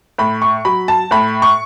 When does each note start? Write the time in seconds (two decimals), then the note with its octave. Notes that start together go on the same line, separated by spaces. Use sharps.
0.18 A2 B5
0.42 C#6
0.65 F#3 B5
0.88 A5
1.11 A2 B5
1.42 C#6